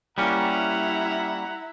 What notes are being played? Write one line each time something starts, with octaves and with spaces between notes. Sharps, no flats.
G3 A#3 C#4 E4 E5 F#5 A#5